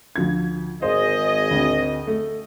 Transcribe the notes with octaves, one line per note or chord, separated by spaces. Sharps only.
D2 F3 G#6
G#1 G#4 C5 D#5
D2 C4
A3